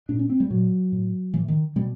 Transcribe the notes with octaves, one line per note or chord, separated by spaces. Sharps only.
A#2 D4
C#4
C4
G3
A#2 F#3
A2
A2 E3
D#3
B2 G3